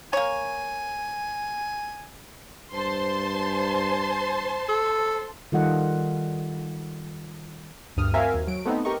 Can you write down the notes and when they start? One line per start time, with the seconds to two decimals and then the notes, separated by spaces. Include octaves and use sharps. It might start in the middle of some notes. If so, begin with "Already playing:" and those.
0.13 A#3 C#5 G#5
2.73 G2 C5 A5 C6
4.69 A4
5.52 D#3 G3 F4 A4 D#5 F#5
7.97 D2 G2 D#6 F6
8.14 C4 F#4 A#4 E5 F5 G#5
8.34 D#2
8.47 F#3 D7
8.65 A3 B3 C4 D#4
8.85 G4 A#4 D#5 C#6